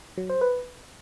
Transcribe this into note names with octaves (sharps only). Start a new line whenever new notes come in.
F#3
C5
B4